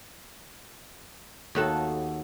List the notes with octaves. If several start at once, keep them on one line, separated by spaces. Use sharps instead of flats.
D#2 F#4 A4